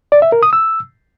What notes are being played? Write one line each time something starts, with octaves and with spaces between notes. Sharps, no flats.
D5
E5
A#4
D#6
E6